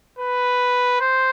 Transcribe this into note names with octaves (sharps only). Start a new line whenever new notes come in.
B4
C5